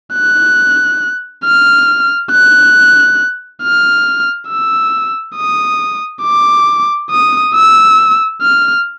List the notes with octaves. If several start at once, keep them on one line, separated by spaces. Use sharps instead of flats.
F#6
F6
F#6
F6
E6
D#6
D6
D#6
E6
F6